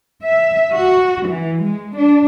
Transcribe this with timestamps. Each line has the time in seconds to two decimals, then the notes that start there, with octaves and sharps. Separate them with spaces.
0.24 E5
0.72 F#4
1.27 E3
1.61 G#3
1.96 D4